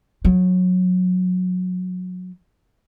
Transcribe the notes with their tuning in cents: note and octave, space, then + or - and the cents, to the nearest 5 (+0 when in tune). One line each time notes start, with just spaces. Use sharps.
F#3 -20